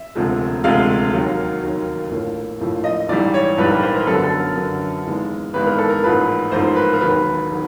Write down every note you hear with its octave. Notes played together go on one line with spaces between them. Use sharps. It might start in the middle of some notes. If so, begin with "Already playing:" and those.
Already playing: E5
E1 D2 C3 F3 G#3
E1 D2 C3 F3 G#3 F5
D#2 D#3 F#3 A#3
D#2 D#3 F#3 A#3
A#1 A2 F3 A#3
A#1 A2 F3 A#3
D#5
A#1 G#2 E3 G3 D5
C#5
A#1 G#2 E3 G3 B4
A#4
C5
A#4
F#2 D3 F#3 B3 A4
A4
A#4
F#2 D3 F#3 B3
G#1 G#2 E3 G#3 B3
G#1 G#2 E3 G#3 B3 B4
A#4
A4
A#4
A1 G#2 F3 A#3 B4
A1 G#2 F3 A#3 C5
B4
A#4
E1 D#2 D#3 F#3 B4
D#3 F#3